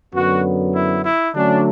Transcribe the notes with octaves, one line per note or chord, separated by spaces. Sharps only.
F#2 D3 F#3 B3 F#4
E4
E4
D3 F#3 A3 C#4 D4